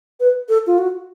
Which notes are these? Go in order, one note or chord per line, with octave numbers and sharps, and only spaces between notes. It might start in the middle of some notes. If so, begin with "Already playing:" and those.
B4
A4
F4
F#4